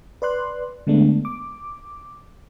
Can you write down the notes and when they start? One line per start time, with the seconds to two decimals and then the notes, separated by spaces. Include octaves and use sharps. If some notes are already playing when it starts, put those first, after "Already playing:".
0.22 B4 D5 C6 F#6
0.87 D3 G#3 A3 B3 D4
1.25 D6